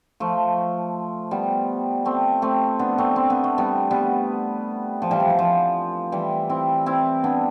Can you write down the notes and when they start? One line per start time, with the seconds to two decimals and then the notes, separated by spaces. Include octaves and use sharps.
0.20 F3 A3
1.31 G3 B3
2.05 A3 C4
2.42 A3 C4
2.79 B3 D4
2.98 A3 C4
3.16 C4
3.30 B3
3.44 A3
3.58 G3 B3
3.91 G3 B3
5.02 F3
5.11 E3 G3
5.20 F3
5.29 E3
5.39 F3
6.12 E3 G3
6.49 C4 E4
6.86 C4 E4
7.24 B3 D4